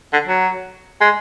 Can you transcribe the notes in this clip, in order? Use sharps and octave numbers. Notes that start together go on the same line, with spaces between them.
D3
F#3
G#3